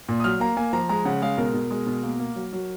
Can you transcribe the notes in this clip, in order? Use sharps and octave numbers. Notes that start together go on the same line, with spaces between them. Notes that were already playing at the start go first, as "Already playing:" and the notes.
A#2
D#6
F#3 F6
A#3 A#5
A#3 G#5
F3 A#5
G#3 A#5
C#3 F#5
G#3 F5
B2 A#4
B2
G#3
B2
A#3
A#3
F#3
F#3